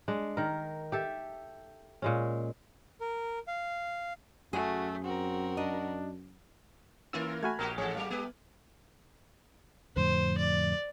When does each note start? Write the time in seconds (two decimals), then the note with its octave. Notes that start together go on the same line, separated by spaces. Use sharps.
0.08 G#3 D4
0.37 D#3 A#4
0.92 G4 A4 E5
2.02 A#2 G#3 C#4
3.01 A#4
3.48 F5
4.53 F#2 A3 F#4 G#4
5.04 C4 F#4 A#4
5.57 D4 D#5
7.13 E3 A#3 C#4 E4 F4 A#4 E6
7.43 A3 F#4 G#5 B5 F6 G#6
7.59 A#1 B3 F#4 G4 A#4
7.78 A1 E3 G#4 A4 C#5 F#5
7.95 F#3 A#3 F5
8.11 G3 B3 G4 B4
9.96 F2 A2 D3 C5
10.37 D5